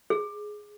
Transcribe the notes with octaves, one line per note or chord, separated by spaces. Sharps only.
G#4